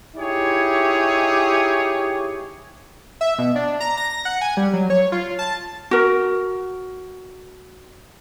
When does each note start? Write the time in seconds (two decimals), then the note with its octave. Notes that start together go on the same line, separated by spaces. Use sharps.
0.16 D#4 E4 G4 G#4 C#5
3.21 E5
3.38 B2
3.56 D4
3.80 A#5
3.98 A#6
4.25 F#5
4.41 G#5
4.57 G3
4.73 F#3
4.90 C#5
5.12 F4
5.39 A5
5.91 F#4 A#4